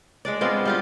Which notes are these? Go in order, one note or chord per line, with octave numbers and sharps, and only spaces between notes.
G#3 D4 D5
G#3 B3 C4 F4
G3 F4 G4